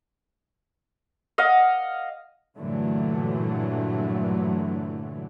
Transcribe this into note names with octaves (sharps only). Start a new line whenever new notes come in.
D#5 F5 F#5
G2 A#2 D3 E3 F#3 A3